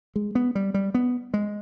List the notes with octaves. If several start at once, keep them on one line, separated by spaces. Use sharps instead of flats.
G#3
B3
G3
G3
B3
G#3